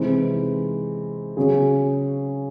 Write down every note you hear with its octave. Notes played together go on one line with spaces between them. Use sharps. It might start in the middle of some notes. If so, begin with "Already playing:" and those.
Already playing: C3 E3 G#3 C4 D#4
C#3 F#3 C#4 G#4